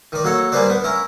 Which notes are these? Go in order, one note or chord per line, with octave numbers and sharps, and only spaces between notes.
D#3 D5
F#3 A#3 F#4 A4 C#5
G3 A#3 G#4 B4 C5 D5
B3 D4
C#4 E4 A#4